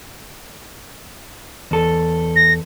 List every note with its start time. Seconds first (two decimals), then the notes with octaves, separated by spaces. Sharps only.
1.71 E2 A4
2.36 A#6